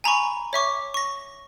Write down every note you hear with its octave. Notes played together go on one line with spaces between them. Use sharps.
G#5 A#5 B5 C#6
C#5 E5 C#6 D6
C#6 A#6